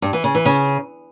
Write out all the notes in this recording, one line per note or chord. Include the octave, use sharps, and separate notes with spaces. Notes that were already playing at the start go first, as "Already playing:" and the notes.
G2
E3
C#3
E3
C#3